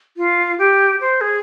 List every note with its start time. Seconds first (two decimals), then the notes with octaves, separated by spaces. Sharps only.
0.17 F4
0.59 G4
1.01 C5
1.21 G#4